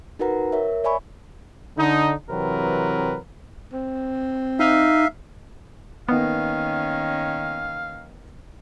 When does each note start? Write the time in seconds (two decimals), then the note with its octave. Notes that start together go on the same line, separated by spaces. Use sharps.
0.19 D#4 F#4 A#4 B4 F#5 A#5
0.52 A#4 C#5 E5
0.84 C#5 D5 E5 G#5 B5 C#6
1.77 D3 D#4
2.30 C3 E3 F#3 C4 A#4 B4
3.73 C4
4.59 D#4 E5 F5
6.09 D#3 A#3 B3 C#4 D#4 B4 F5